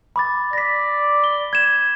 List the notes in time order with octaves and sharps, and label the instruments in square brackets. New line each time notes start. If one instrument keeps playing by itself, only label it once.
[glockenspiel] B5 D6 A6
[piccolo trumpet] D5 [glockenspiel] A#6 B6
[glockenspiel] G7
G#6 E7